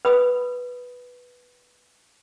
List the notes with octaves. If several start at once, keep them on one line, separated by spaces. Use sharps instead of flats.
B4 B5 D#6